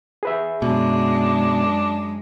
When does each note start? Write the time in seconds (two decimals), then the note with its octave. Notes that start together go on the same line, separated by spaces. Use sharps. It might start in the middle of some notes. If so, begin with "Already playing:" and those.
0.23 G#4 B4 E5
0.62 F#2 B2 G#3 D4